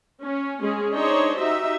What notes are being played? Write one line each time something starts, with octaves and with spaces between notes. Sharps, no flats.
C#4
G#3 C#4 G#4
D4 D#4 G#4 C5 C#5 D#5
D#4 F#4 G4 D#5 E5